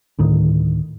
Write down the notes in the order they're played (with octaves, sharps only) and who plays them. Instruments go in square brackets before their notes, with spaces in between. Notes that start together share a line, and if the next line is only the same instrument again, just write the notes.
[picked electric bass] D2 A2 D#3